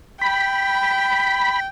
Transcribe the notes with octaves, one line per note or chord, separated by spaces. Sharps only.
G5 B5